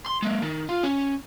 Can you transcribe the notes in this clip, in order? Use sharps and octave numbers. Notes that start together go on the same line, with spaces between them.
C6
G#3 A#3
D#3
F4
C#4